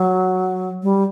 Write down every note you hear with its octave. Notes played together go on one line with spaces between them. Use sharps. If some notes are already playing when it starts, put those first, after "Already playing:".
Already playing: F#3
G3